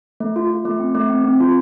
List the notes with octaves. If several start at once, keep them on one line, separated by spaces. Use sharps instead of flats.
A3
F4
F4
A3
C4
A3
C4
C4
F4